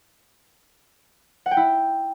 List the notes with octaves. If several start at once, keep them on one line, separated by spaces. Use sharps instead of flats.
F#5
G5
E4